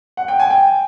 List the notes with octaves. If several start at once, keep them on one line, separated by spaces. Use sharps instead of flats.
F#5
G5
G#5
G5